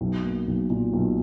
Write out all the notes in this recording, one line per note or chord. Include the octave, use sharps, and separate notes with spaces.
B1
A#3
B1
A#2
B1